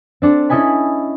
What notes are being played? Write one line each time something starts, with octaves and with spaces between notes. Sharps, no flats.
C4 D4 A4
C#4 E4 A4 D#5 G#5 B5